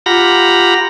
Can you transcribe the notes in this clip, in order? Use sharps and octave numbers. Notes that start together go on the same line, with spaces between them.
F4 G4 F#5 A#5 B5 A#6